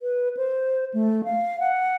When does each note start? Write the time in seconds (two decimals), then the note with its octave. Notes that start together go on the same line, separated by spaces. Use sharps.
0.02 B4
0.37 C5
0.94 A3
1.24 F5
1.60 F#5